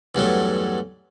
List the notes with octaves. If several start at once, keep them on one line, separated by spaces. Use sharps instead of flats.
E2 G2 F#3 A3